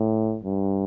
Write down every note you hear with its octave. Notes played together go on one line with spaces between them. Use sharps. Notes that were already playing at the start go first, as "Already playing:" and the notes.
Already playing: A2
G2